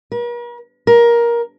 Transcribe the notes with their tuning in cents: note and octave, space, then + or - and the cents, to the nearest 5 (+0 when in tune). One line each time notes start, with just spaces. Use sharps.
A#4 +45
A#4 +15